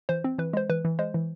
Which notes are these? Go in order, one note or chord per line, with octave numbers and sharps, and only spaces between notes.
E3 C5
C4
E3 B4
G#3 C5
E3 B4
E3
G#3 C5
E3